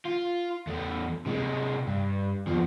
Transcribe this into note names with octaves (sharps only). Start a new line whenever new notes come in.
F4
E2 A3
C3 G#3
G2
E2 F3